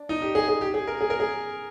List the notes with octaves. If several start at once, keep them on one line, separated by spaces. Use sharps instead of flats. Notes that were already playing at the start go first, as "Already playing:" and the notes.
Already playing: D4
D#4
G4
G#4
G#4
G4
G#4
A#4
G#4
A#4
G#4